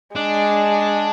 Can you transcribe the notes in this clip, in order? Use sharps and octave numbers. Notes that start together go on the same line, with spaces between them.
G#3 D4